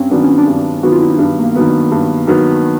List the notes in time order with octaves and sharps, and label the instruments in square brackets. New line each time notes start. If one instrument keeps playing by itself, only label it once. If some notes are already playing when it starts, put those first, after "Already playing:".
Already playing: [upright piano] G2 [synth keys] C4 C#4
[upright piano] D#3 F#3 B3 [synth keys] D4
[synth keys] C#4
D4
[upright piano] G2
[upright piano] D#3 F#3 B3 [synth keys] F#4
[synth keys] F4
E4
D#4
[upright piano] G2 [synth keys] D4
[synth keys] A#3
B3
[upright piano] D#3 F#3 B3
[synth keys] D4
[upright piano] G2
D#3 F#3 B3